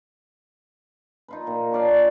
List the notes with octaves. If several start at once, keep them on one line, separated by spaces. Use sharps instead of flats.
D#4 F4 B4
A#2
D4 C#5 D5 F5
C#5